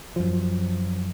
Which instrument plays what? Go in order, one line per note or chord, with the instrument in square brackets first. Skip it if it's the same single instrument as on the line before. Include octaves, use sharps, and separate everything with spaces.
[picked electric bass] F#2 F3